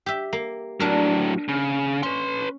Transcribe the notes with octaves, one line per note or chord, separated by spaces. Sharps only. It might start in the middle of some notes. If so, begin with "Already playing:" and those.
G4 E5
A#3
A2 F#3 D4 A#4
C#3
C#4 B4 C6